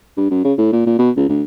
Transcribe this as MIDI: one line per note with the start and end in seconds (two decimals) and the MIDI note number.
0.17 0.30 43
0.30 0.41 42
0.45 0.53 49
0.58 0.72 45
0.73 0.84 46
0.87 0.97 46
0.99 1.10 47
1.17 1.25 37
1.29 1.42 38